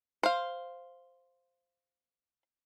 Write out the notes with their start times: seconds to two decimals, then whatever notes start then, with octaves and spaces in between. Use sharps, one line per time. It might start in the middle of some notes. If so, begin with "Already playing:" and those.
0.23 C5 F5